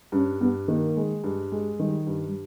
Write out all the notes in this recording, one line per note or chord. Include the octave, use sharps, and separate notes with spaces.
G2 C#4
G2 B3
D#3 A#3
G#3
G2
G#3
D#3 G3
G2
G3